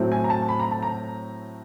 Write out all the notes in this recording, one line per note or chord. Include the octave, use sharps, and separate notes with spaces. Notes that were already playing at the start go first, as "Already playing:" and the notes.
Already playing: A2 F#3 A3 C4
G#5
A#5
A5
B5
A#5
A5
A#5